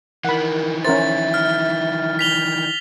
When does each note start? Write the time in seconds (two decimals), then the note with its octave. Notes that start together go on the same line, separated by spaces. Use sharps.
0.25 D#3 E3 A#4 F#5 B5
0.85 C#4 A#4 C5 E5 A6
1.34 F6
2.19 B6 F7 G7